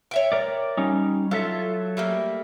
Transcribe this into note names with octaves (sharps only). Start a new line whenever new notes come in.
C#5 E5 G5
A#4 D5
G3 C#4 D#4
F#3 F4 A4 E5
G3 A3 A#3